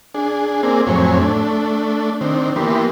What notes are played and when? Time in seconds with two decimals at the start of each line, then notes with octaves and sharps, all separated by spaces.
0.14 D4 G#4
0.63 A#3 C4 G#4 D5
0.86 F2 A2 F#3 C4 C#5 G#5
1.19 A3 D4
2.21 D#3 C4 D4
2.56 E3 A#3 B3 G4 C6